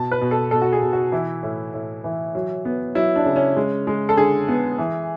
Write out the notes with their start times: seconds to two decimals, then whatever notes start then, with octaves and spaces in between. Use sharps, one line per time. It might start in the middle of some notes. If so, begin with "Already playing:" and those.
Already playing: B2 A5
0.11 B4
0.21 B2
0.31 A4
0.51 B2 A4
0.62 F#4
0.72 G#4
0.82 B2
0.93 F#4
1.12 E3 E4
1.43 A2
1.74 A2
2.04 E3
2.35 F#3
2.65 B3
2.95 F#3 E4
3.16 D4
3.25 C#3
3.36 C#4
3.56 G#3
3.87 G#3
4.09 A4
4.17 D3 G#4
4.48 B3
4.78 E3